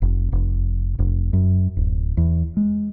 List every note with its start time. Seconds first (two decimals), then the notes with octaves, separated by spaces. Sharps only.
0.02 F1
0.32 F1
0.99 F1
1.33 F#2
1.77 D1
2.17 E2
2.57 G#3